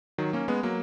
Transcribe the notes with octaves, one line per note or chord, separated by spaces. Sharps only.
D#3 F#3
A#3 C#4
G#3 B3
F#3 A#3